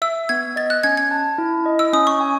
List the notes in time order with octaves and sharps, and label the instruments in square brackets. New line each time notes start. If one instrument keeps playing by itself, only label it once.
[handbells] E5 [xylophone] E6
[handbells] B3 [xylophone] G#6
[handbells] D#5 [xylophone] A6
[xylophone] F#6
[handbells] C#4 [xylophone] G#6
[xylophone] G#6
[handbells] A5
E4
D#5
[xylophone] E6
[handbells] C#4 [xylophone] D#6
[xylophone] C#6
[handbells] G#5